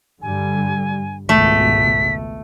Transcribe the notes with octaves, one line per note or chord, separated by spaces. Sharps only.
G2 D3 G3 G#5
G#1 C#2 B2 A3 B6